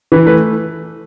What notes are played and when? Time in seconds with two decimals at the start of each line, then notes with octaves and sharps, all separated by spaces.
0.12 E3 B4
0.26 A3 B4